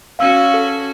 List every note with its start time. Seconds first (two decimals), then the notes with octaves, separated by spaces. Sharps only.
0.19 C#4 F#4 F5 E6
0.54 A4